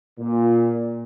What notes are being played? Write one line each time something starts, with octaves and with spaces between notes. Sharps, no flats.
A#2